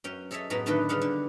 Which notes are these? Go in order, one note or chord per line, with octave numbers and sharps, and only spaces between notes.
F#2 C#4 G5
G#4 A4 C#5 D#5 E5 A5
F#2 A2 B3 G#4 A#5 B5
A2 D3 D#3 A3 B4 D#5
C#3 G3 G#4 F5 F#5
D3